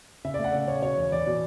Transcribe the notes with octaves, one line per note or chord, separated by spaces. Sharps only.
C#3 E5
A3 D5
F#5
C#3 D5
C#3 C#5
B2 C#5
E2
E2 D5
B2